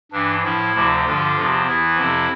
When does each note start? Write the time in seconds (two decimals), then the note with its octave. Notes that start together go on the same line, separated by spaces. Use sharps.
0.12 G2 E3 D4
0.43 A2 F3 E4
0.74 D2 C3 F3
1.05 G2 D3 F3 F4
1.35 E2 C3 F3
1.66 E2 E3 E4
1.97 F2 C3 F3